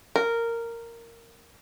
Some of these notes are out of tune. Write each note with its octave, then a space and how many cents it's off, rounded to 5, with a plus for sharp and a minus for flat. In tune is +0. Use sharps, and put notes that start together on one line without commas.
A#4 -10